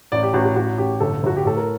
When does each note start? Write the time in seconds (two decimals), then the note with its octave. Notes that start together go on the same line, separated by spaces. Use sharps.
0.12 A1 D5
0.23 G4
0.34 A1 F#4
0.45 F#4
0.56 A1 F#4
0.78 A1 G4
1.00 G1 A4
1.23 G1 F#4
1.37 G4
1.45 A2 A4
1.57 A#4